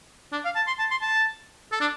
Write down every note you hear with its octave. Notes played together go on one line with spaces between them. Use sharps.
D4
F5
A5
C6
A5
C6
A5
A4
D4